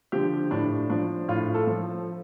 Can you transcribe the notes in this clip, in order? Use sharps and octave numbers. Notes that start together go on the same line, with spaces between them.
D3 F3 G4
A2 D4
F3 D4
A2 F4
A4
F3